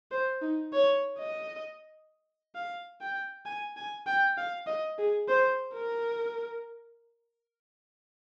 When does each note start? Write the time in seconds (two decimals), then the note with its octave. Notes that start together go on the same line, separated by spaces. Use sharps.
0.11 C5
0.42 D#4
0.73 C#5
1.18 D#5
2.55 F5
3.01 G5
3.46 G#5
3.77 G#5
4.07 G5
4.37 F5
4.67 D#5
4.98 G#4
5.28 C5
5.74 A#4